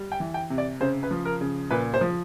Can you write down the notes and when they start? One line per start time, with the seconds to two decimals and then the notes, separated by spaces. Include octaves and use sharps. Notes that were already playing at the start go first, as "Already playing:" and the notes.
Already playing: G3
0.12 G5
0.20 E3
0.34 G5
0.50 C3
0.58 D5
0.81 C#3 C5
1.03 B4
1.11 F3
1.25 A#4
1.41 C#3
1.71 A#2 B4
1.94 C5
2.01 F3